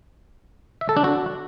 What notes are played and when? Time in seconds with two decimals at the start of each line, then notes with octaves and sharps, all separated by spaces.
0.81 E5
0.89 A4
0.97 D4
1.04 F#4